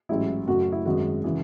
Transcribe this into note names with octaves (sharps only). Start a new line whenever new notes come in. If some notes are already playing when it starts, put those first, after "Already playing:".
A1 G#2 F#3 E4
F#2 C#3 F#3 A3 F#4
F#4
E4
G#1 F#2 D#3 G#3 F#4
C#3 E3